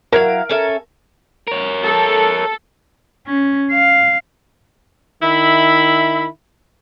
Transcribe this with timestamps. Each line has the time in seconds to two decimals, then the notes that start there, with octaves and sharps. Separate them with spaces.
0.12 F#3 E4 A#4 F5
0.49 C#4 A4 E5
1.48 A#4 C#5
1.83 A4
3.26 C#4
3.71 F5
5.22 D#3 E4 E5 B5